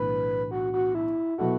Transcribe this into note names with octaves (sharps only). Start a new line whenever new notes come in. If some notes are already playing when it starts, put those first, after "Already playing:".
Already playing: B1 A2 E3 D4 B4
F#4
F#4
E4
B2 F#3 B3 E4 F#4 A4